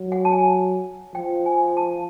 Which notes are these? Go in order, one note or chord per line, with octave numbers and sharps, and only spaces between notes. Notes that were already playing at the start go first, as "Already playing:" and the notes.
Already playing: F#3
F#5
A5
G#5
F3 G5
G#5
A5